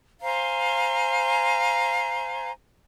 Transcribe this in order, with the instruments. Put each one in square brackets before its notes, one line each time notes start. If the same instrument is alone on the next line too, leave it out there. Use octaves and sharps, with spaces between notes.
[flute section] C5 F5 G#5 A#5